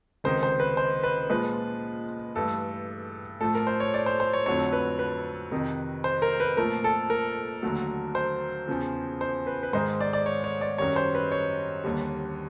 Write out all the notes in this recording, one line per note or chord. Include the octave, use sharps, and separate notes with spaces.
C#2 C3 D#3 C5
C5
B4
C5
B4
A#2 F3 G#3 B4
G2 E3 A3 A4
A2 F3 A3 A4
A#4
C5
C#5
D5
C5
C5
C#5
F2 D3 F#3 A3 C#5
B4
B4
F2 C3 D#3
C5
A#4
B4
A#2 F3 A3 A#4
A4
A#4
D#2 D3 F#3 A3
C5
E2 C#3 F3
C5
B4
B4
G#2 D#3 G#3 C5
D5
D5
C#5
C#5
D5
F#2 D#3 G3 C#5
C5
B4
C#5
D#2 D3 G3